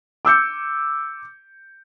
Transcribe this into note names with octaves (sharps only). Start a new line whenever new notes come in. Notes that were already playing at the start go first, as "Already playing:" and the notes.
D6 E6 G6 C#7